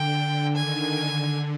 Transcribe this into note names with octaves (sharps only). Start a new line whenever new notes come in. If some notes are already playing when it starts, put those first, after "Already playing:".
Already playing: D3 G5
D#3 G#5
D3